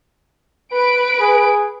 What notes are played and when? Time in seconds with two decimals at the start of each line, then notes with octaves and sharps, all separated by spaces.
0.73 B4 D7
1.20 G#4